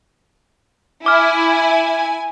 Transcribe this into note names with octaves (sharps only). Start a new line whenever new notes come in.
E4 G#5 D6 F6